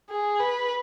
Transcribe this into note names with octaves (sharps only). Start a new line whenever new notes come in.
G#4
B4